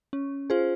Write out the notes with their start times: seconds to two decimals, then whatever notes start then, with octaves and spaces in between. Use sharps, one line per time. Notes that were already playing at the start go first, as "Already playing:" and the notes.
0.13 C#4
0.50 F4 G#4 C5